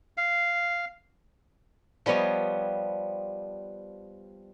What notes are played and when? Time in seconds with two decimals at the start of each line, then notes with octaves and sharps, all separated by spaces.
0.17 F5
2.06 F3 G3 B3 C#5 D#5